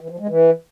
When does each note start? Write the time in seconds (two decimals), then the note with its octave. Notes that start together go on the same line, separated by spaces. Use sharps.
0.01 E3
0.10 F3
0.19 G#3
0.29 E3